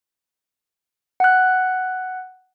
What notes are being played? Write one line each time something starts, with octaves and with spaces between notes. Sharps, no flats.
F#5 F#6